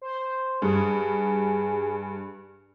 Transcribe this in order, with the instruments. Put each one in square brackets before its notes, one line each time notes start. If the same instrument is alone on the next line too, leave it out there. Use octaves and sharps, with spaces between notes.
[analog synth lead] C5
[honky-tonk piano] G2 [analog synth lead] G#4